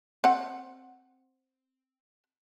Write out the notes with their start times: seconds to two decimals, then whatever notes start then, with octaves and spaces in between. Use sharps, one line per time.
0.24 C4 F#5